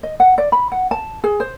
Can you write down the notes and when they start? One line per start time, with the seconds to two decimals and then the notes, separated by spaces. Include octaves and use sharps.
0.03 D#5
0.20 F#5
0.38 D5
0.52 B5
0.72 F#5
0.91 A5
1.24 G#4
1.40 C5